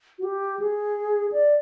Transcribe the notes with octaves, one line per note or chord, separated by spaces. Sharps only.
F#4
G4
G#4
D5